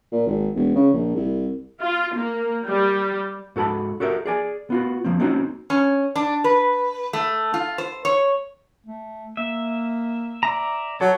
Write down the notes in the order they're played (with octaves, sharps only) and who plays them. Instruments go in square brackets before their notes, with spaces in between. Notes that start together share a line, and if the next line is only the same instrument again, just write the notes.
[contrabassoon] A#2
G#1
E1
C#3
A#1
C2
[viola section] F4
A#3
G3
[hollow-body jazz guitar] G#2 F#4 A4 A5 B5
F#4 G4 A4 A#4 E5
G#4 D5 G#5
B3 F4 F#4
F3 A#3 C4
A#3 C4 C#4 D#4 F#4
[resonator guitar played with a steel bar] C#4
D4
B4
A3
F4
C5
C#5
[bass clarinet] A3
[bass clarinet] A#3 [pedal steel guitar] E5
[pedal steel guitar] D5 E5 A#5
[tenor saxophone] F#3 [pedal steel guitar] A4 C#5